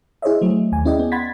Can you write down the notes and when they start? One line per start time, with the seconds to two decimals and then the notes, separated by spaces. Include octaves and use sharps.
0.22 E4 G#4 C5 C#5 D#5 E5
0.41 F#3 A3
0.72 D#2 G#5
0.85 C#4 E4 G#4 D5 D#5 G5
0.99 B3
1.12 F#5 B5 C6 G#6 A6 B6